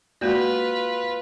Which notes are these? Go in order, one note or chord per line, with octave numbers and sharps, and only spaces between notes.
G#3 A#3 F4 F#4 B4 D5